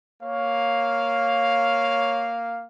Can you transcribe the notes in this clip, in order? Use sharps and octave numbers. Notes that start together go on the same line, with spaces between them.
A#3 C#5 F5